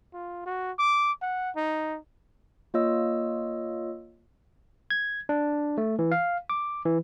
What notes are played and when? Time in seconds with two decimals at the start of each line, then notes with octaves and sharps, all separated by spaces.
0.13 F4
0.46 F#4
0.79 D6
1.22 F#5
1.56 D#4
2.74 A#3 F4 C#5 D#5 E6
4.90 G#6
5.29 D4
5.78 A3
5.99 E3
6.12 F5
6.50 D6
6.86 E3